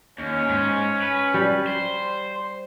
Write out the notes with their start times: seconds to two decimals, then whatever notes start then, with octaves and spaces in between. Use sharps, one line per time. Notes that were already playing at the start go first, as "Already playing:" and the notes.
0.18 D#2 C#4
0.49 G#2
1.02 B4
1.34 G3
1.67 C5